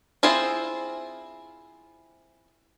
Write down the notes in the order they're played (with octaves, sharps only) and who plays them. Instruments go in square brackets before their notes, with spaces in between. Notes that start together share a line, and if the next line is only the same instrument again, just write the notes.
[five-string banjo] C4 E4 F4 G#4 C5